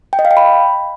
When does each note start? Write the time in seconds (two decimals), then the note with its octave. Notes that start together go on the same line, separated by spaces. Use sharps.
0.13 G5
0.19 D#5
0.25 F5
0.31 G5
0.37 B5